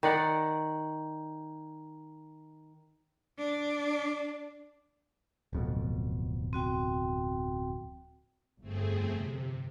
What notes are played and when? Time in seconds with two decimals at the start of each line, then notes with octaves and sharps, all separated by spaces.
0.03 D#3 D5 F#5
3.38 D4
5.53 D1 F2 B2
6.53 C4 F#4 G5
8.61 G1 F2 A3 C4 G#4
9.13 C3